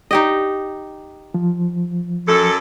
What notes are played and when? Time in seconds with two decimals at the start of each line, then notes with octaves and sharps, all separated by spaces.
0.11 D#4 G4 D#5
1.34 F3
2.28 F#2 A4